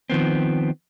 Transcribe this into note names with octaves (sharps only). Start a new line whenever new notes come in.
D#3 F3 B3 C4